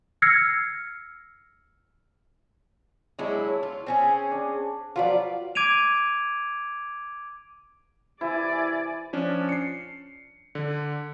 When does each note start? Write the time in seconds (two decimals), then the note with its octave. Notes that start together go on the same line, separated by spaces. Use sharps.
0.22 E6 F6 G#6 A#6 C7 C#7
3.19 F#3 G#3 D4 E4
3.48 C#5
3.63 F4
3.86 C4 C#4 G#4
4.32 D4
4.96 F3 F#3 F4 B4 D5
5.55 D6 G#6 D7 D#7 F7
8.21 C3 E3 E4 D5 G#5
9.13 F3 C#4 D4
9.49 C7 C#7
10.55 D3